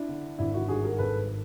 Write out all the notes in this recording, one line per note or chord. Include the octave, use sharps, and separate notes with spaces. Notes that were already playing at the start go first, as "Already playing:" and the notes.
Already playing: D4 E4
D3
G#1 D4 E4
E4 F#4
G2 F#4 G#4
G#4 A#4
G#1 A4 B4